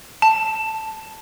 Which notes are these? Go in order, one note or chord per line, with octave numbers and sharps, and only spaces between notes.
A5